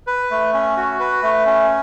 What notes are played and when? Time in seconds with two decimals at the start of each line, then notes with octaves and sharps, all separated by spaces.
0.07 B4
0.31 A3
0.53 C#4
0.77 F#4
1.00 B4
1.23 A3
1.46 C#4